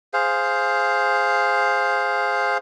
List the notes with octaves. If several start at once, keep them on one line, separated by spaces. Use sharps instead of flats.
G#4 C5 F5